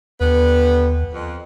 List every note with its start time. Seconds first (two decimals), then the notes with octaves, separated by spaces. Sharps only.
0.20 D#2 D3 G3 B3
1.12 F2